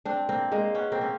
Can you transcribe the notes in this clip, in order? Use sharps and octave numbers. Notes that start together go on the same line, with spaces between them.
C4 D4
A#3 C4
G#3 A#3
B3 C#4
A#3 C4
C#4